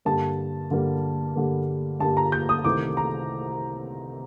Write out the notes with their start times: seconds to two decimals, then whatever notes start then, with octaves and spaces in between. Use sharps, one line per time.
0.05 G2 D3 G3 A#3 A5
0.70 G2 D3 G3 A#3
1.35 G2 D3 G3 A#3
1.99 G2 D3 G3 A#3 A5
2.17 A#5
2.32 G6
2.49 D#6
2.65 C2 C3 D#3 A3 D6
2.97 A#5